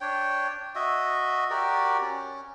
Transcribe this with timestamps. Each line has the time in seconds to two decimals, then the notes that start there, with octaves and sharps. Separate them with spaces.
0.01 D4 C#5 G5
0.75 F#4 D#5 E5
1.50 F#4 G4 A#4 D5
2.02 C#4